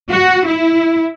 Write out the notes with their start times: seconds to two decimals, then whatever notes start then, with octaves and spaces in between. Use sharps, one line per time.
0.10 F#4
0.46 E4